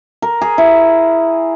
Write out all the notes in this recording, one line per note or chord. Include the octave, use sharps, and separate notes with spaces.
A#4
G#4
E4